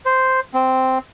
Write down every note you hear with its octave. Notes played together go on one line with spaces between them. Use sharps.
C5
C4